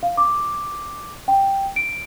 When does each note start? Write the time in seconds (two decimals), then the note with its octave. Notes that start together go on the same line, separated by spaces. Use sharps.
0.03 F5
0.17 D6
1.28 G5
1.76 D7